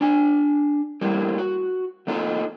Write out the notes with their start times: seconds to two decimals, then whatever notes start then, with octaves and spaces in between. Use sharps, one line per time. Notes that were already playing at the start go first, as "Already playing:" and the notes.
0.01 D4 G#5
1.01 G3 A3 A#3 E4 G4
1.38 F#4
2.07 A3 A#3 D#4 F4 A4